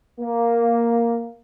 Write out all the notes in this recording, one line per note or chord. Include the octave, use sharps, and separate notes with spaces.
A#3